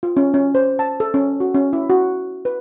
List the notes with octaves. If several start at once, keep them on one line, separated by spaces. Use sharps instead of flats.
F4
C#4
C#4
C5
A5
A4
C#4
F#4
C#4
E4
F#4
B4